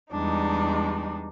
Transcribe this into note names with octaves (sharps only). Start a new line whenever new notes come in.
E2 G3 G#3 D4 D#4